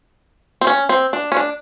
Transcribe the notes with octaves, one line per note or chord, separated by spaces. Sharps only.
C4
C#4
C4
D4
C#4
D4